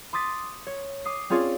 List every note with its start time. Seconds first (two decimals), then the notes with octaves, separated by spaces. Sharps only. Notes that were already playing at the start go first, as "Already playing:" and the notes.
0.13 C6 D6 D#6 A6 B6
0.67 C#5
1.05 D6 D#6 C7
1.30 C4 C#4 F4 G#4 C#5 D5